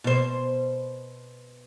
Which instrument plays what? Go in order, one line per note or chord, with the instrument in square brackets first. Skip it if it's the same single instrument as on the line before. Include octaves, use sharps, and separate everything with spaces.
[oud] B2 C5